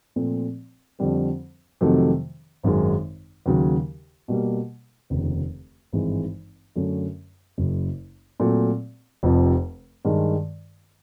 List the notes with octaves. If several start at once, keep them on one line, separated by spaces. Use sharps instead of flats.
A#2 F3 A3 C4
F2 D3 G3 C4
F2 C3 D#3 F#3 A3
G#1 F#2 D#3 G#3
D#2 C#3 F#3
B2 G3 A#3
F1 D#2 C#3
G#1 G2 E3 G#3 C4
F#2 D3 F#3 A3 C#4
F#1 F#2 C#3
A#2 F#3 A3 C4
F1 F2 C3 F3
G2 D#3 G#3